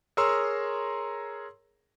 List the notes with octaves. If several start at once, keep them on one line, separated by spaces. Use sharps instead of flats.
G#4 A#4 C#5 A#5 C6 E6